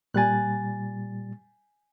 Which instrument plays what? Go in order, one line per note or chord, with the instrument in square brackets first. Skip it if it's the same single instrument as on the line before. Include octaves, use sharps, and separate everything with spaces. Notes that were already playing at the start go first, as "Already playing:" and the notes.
[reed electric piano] A#2 G3 A6 [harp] G#5 F#6